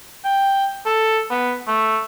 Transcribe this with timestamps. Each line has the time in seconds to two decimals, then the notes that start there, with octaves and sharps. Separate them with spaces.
0.25 G5
0.86 A4
1.30 B3
1.67 A3